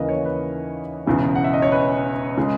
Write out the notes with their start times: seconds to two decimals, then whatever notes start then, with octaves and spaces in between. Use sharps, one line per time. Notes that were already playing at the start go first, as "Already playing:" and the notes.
Already playing: D#2 C#3 E3 A#3 B4 D#5
0.09 C#5
0.25 B4
1.06 E1 E2 C#3 E3
1.35 F#5
1.44 E5
1.53 D#5
1.62 C#5
1.72 B4
2.38 C#3 G#3